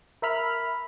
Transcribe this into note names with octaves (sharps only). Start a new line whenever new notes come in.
A#4 E5 B5 F6